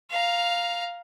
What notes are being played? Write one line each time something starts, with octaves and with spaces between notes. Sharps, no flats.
F5 A#5